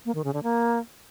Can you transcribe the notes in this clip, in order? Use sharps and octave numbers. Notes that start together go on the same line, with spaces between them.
A#3
D#3
C#3
D3
A#3